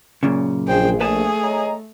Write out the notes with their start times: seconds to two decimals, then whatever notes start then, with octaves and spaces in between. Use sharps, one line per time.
0.23 F#2 A#2 C#3
0.68 A#1 G#4 C5 G5
1.01 A3 G#4 B4 A5
1.43 C#5 D#5 A#5